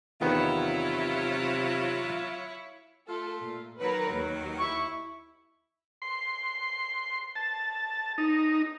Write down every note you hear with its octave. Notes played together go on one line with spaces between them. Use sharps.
E2 C3 D#3 F#3 B3 E4 F4 C#5
A3 F4 A4
A#2
D#3 F#3 A#4 B4
D#2
E4 C#6
C6
A5
D#4